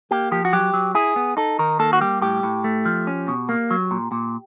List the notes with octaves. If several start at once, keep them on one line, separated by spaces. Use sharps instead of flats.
A#3 G4
F3 G4
F#4
F#3 G4
F#3
E4 G#4
B3
D#4 A4
D#3 A#4
A#3 A4
F#4
G3 G4
A2 G4
A2
A3
F3
C#4
B2
A#3
F#3
A#2
A#2